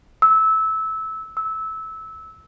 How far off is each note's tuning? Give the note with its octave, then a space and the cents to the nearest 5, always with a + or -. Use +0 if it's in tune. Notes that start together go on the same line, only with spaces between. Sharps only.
E6 -20
E6 -20